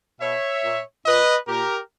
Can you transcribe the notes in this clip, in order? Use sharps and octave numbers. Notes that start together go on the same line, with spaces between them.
B2 C#5 E5
A#2
A#2 B4 D#5
A#2 G4 A#4